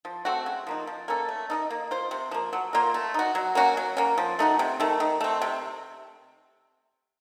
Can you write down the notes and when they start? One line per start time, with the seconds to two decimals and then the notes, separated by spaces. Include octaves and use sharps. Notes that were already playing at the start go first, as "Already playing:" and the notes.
0.05 F3
0.25 A3 C4 F#4
0.46 C#3
0.67 F3 A#3 D#4
0.87 F3
1.08 A#3 C#4 A4
1.28 A3
1.50 D#4 A4 D#5
1.70 A#3
1.91 F4 C5
2.11 C3
2.31 F3 A#3
2.53 F#3
2.73 A#3 F4 A#4
2.94 A3
3.14 D#4 F#4
3.35 F#3
3.55 A#3 C#4 F#4
3.77 F#3
3.97 A#3 C#4
4.18 F3
4.39 A3 D#4 F#4
4.59 C3
4.80 D#3 A3
5.00 D#3
5.21 A3 C4
5.42 C3